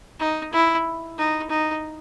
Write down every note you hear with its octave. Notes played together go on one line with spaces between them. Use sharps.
D#4
E4
D#4
D#4